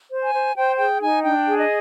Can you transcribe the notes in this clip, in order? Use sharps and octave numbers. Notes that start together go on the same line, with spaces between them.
C5
G#5
C5
C5 G5
G#4 G5
D#4 G#5
D4 G5
G#4
D#5